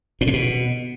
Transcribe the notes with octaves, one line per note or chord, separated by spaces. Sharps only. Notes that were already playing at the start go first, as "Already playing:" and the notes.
A2
C3
B2